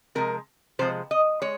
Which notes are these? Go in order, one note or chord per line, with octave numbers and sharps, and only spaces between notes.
C3 F3 G#3 A#4
C3 F3 G#3 C5
D#5
G#3 C#5